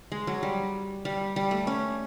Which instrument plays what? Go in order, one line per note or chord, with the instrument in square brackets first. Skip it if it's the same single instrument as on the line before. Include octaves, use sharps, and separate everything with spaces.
[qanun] G#3
F#3
G3
G3
G3
A3
C#4